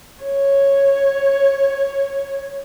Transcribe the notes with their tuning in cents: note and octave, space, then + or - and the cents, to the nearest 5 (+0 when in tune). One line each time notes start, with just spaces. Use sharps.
C#5 -5